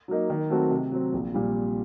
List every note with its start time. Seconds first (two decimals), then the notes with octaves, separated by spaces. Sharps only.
0.08 F#3 A#3 D#4
0.30 D#3
0.50 F#3 A3 C4 F#4
0.71 C3
0.91 F#3 C4
1.13 A#1
1.34 A#2 G3